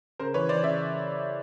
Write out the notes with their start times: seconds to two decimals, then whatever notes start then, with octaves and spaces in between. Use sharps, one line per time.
0.19 C#3 A#4 C5
0.34 E3 B4 C#5
0.49 E3 C5 D5
0.63 C#3 D5 E5